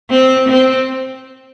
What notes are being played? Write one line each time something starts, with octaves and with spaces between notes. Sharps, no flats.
C4
C4